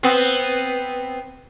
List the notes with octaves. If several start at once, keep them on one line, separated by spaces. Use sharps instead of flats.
B3 C4